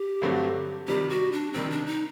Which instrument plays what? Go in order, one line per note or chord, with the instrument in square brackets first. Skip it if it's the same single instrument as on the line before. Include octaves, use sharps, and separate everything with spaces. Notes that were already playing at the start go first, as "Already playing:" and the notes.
Already playing: [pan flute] G4
[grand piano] G2 D3 F#3 A3 C4
[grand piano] C3 D#3 G3 [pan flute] G4
[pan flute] F#4
D4
[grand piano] C3 D#3 G3 [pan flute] C4
[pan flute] D4
D#4